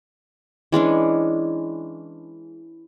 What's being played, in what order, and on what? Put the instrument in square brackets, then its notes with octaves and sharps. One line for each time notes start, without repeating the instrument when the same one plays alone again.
[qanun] E3 G#3 C#4 D4